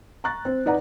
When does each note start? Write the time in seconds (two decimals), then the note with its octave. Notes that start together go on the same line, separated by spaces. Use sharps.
0.24 A#5 C#6 F#6 A6
0.45 C4
0.66 D#4 B4 D5 F#5 A#5